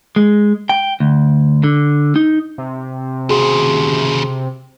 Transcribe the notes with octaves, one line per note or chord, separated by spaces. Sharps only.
G#3
G5
D2
D3
D#4
C3
D#2 C#3 F#4 G#4 C6